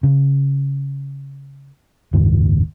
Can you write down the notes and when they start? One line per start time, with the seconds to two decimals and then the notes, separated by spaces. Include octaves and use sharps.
0.03 C#3
2.13 F#1 D#2 G#2